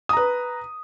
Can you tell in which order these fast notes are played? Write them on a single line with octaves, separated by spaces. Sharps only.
D#6 A#5 B4